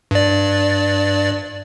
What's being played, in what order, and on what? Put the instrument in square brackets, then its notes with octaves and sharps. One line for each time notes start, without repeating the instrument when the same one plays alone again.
[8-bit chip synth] G2 D5